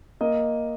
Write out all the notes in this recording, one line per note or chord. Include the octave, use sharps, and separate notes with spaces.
A#3 D#5